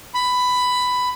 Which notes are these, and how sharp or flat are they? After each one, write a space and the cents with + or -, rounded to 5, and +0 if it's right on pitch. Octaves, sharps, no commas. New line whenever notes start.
B5 +10